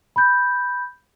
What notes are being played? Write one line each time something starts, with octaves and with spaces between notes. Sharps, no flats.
B5 G6